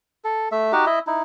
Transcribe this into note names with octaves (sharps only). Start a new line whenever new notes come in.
A4
A3 E5
D#4 F#4 G4
E4 D#5 E5
D#4 E4